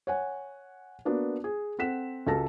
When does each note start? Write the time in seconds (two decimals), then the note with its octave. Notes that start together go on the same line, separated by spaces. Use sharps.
0.07 C#5 F#5 G#5
1.05 A#3 B3 D4 F#4
1.44 G#4
1.79 C4 A4 F#5 B6 E7
2.27 C#2 F#4 A4 A5 A#6